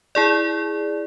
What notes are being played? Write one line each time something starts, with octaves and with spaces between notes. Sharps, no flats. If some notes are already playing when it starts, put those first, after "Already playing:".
E4 G#4 D5